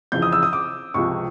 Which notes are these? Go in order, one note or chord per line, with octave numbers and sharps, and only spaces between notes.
F2 C#3 E3 G6
D#6
E6
D#6
D6
C#2 C3 F3 C#6